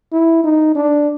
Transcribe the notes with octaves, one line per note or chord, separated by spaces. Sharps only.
E4
D#4
D4